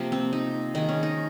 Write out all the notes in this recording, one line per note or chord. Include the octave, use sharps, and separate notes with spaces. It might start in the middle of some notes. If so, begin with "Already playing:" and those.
Already playing: C3 F3 A#3
C4
D#4
D#3 G#3 D#4
C#4
D#4